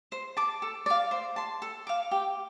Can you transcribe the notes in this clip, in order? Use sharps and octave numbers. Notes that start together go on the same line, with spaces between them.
C5
A5 D6
A4
D5 F5
C5
A5 C6
A4
F5 D6
G4